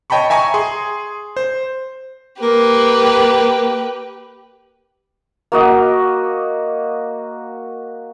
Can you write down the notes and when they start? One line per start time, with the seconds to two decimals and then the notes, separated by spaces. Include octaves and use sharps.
0.10 C#5 D#5 G5 A5 B5 C#6
0.30 E5 G#5 A#5 C#6
0.54 G#4 C6
1.37 C5
2.42 A#3 G4 B4
5.52 A#3 F#4 D#5